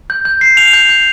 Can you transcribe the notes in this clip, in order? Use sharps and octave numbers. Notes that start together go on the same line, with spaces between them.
G6
G6
C7
F7
G6
G6